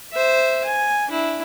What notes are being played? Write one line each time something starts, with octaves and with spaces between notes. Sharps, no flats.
C5 E5
G#5
D4 E4